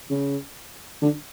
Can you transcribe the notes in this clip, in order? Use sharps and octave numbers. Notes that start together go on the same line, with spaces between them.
C#3
D3